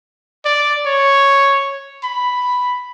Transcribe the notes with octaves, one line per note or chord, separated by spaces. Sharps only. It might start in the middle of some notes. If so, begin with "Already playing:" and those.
D5
C#5
B5